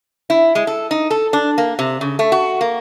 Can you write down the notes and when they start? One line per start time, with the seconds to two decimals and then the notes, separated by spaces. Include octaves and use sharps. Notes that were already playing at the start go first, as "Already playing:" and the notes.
0.30 E4
0.55 G#3
0.67 A4
0.91 D#4
1.10 A4
1.33 D4
1.58 A#3
1.79 C3
2.01 C#3
2.19 A3
2.32 F#4
2.61 A#3